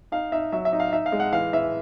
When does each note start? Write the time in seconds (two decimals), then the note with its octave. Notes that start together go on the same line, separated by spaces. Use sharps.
0.12 D#4 F5
0.32 D#4 E5
0.52 F#3 E5
0.65 E5
0.73 D#4
0.80 F5
0.92 D#4 E5
1.06 F5
1.12 G#3
1.20 F#5
1.32 E3 F5
1.53 E3 E5